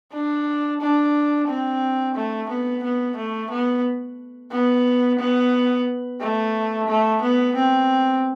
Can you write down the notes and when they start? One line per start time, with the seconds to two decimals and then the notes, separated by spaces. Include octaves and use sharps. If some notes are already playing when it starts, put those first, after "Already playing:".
0.13 D4
0.81 D4
1.48 C4
2.15 A3
2.49 B3
2.83 B3
3.16 A3
3.50 B3
4.51 B3
5.19 B3
6.20 A3
6.88 A3
7.22 B3
7.55 C4